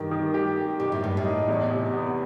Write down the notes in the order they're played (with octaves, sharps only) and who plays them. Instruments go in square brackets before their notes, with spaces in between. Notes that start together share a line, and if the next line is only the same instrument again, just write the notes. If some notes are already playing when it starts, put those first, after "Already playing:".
Already playing: [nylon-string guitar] G2 [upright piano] D#3 G4
[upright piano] D#3
G4
G4
[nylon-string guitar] B2 [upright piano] G4
[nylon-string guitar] A2
[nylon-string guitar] G2 [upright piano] G3
[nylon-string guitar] A2
[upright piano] D#4
E2
C3
B3